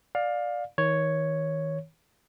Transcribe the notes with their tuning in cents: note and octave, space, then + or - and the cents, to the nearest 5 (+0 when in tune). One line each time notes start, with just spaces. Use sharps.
D5 +5 F5 +20
D#3 +35 C#5 +0